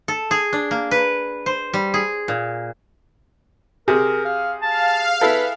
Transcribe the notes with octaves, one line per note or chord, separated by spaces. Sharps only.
A4
G#4
D4
A#3
B4
C5
G3
G#4
A#2
C3 G#4 A#4
F5
F5 A5
E4 A4 B4